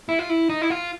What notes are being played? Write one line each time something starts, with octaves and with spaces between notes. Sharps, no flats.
E4
F4
E4
D#4
E4
F4